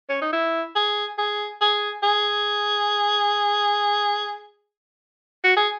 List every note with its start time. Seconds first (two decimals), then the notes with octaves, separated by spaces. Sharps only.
0.09 C#4
0.21 D#4
0.32 E4
0.76 G#4
1.18 G#4
1.61 G#4
2.03 G#4
5.44 F#4
5.56 G#4